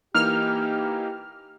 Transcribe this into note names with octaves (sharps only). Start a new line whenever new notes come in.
E3 A#3 D#4 G4 F6